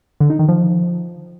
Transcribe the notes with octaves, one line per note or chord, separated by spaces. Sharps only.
D3
D#4
D#3
F3